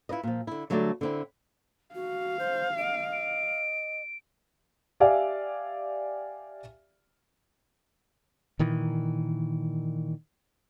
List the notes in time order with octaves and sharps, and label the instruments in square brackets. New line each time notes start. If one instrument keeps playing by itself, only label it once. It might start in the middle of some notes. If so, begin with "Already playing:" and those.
[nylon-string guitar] E4 F4 B4 D#5
A#2 F3
D3 E4
D3 F#3 G3 A3 D4 D5
D3 C4 E4
[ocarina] F#4 [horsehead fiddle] F5
[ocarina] C5 [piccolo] G6
[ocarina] D#5 [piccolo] D7
[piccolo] D7
[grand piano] G4 D5 E5 F5 G#5
[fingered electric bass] A#2 D#3 E3